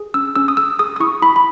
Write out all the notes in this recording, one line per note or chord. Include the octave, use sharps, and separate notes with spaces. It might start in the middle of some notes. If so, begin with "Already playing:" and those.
Already playing: G#4
C#4 E6
C#4 E6
D#6
G#4 E6
G#4 D#6
D#6
E4 C#6
E4 B5
B5